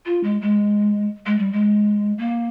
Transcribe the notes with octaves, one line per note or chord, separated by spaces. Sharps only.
F4
G#3
G#3
G#3
G3
G#3
A#3